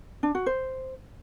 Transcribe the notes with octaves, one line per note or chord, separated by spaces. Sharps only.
D4
F#4
C5